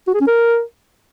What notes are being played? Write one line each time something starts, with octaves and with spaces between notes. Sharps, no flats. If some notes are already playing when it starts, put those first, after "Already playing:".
F#4
G#4
C#4
A#4